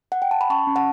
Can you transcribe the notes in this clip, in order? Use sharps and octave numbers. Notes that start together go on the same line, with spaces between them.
F#5
G5
A5
B5
C#4 A5 C#6
C#4
F#5 A5